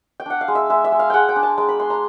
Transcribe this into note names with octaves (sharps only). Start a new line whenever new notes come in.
G5
D4 F#5
F5
G#3
E5
G#3 E5
E5
G#3
F5
G#3 F#5 G5
G5
D4
A5
G#3 A#5
B5
G#3 C6
A#5